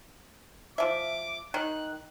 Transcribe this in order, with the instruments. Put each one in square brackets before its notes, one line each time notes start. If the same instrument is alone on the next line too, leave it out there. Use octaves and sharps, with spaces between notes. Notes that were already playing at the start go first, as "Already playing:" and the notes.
[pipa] F3 E5 [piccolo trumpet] D6
[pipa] D#3 [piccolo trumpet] F#6